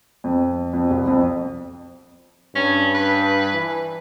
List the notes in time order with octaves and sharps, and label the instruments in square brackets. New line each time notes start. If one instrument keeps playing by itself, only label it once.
[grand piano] F2
F2
C2
F2
[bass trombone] G2 [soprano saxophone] C#4
[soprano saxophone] B4
[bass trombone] E3